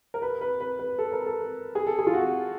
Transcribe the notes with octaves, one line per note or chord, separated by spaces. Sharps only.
A#4
B4
B4
B4
B4
A4
A#4
A4
G#4
A4
G#4
F4
F#4